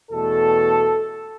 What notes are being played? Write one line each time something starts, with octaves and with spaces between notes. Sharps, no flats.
E2 B2 A3 A4